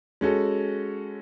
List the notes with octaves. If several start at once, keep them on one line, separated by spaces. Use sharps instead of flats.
G#3 C#4 F#4 A4